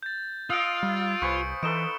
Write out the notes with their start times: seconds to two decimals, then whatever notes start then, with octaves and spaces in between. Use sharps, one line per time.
0.03 G6 A6
0.50 F4 D#5 F5 D#6 E6 D7
0.83 G3
1.22 C2 B4 C5 G#5 C#6 E6 C#7
1.63 E3 D#4 A4 B4 D7 E7 G7